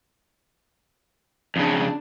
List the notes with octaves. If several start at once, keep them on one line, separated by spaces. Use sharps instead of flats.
F2 C#3 D4